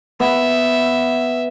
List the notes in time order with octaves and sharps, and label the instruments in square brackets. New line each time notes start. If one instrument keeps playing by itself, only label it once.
[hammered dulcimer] B3 [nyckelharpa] E5